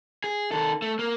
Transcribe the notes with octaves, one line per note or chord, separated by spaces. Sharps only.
G#4
D#3 A4
A3
A#3